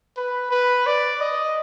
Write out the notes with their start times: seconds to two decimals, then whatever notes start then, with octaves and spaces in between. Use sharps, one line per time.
0.17 B4
0.51 B4
0.87 D5
1.21 D#5